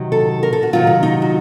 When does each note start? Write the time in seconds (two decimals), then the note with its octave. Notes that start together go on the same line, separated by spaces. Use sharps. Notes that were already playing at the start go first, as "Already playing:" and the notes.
Already playing: C3 D#3 F#3
0.12 A4
0.43 A#4
0.53 A4
0.63 F#4
0.73 C3 D#3 F#3 F4
0.87 D#4
1.03 D#4
1.22 F#4